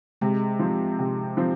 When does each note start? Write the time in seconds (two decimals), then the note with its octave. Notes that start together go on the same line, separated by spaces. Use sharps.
0.21 C3 G#3
0.59 F3 C4
0.99 C3
1.37 F3 C4